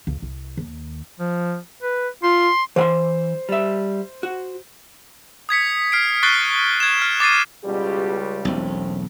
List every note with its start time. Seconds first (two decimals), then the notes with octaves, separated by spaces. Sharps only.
0.07 C#2
0.22 C2
0.57 D#2
1.19 F3
1.83 B4
2.23 F4 C6
2.76 E3 C5 F#5 C6
3.49 G3 E5
4.23 F#4
5.49 D#6 G#6 B6 C#7
5.92 F6 C7 D7
6.23 C#6 F#6 A6 C7 D7 G7
6.80 G#6 E7
7.02 F6
7.20 D6 A6 C7 D#7
7.64 C#2 B2 G3 G4
8.45 E1 B1 A3 C4 C#4